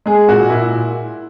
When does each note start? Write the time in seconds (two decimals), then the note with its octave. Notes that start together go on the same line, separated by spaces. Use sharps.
0.06 G#3 G#4
0.28 A#2 F#4
0.50 A#2 E4